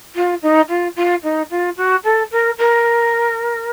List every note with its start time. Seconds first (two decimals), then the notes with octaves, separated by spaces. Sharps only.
0.15 F4
0.42 D#4
0.69 F4
0.96 F4
1.23 D#4
1.50 F4
1.77 F#4
2.04 A4
2.31 A#4
2.58 A#4